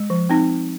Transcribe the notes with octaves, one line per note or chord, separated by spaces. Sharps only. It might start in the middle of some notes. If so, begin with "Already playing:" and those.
Already playing: G#3
F3
C4 D#4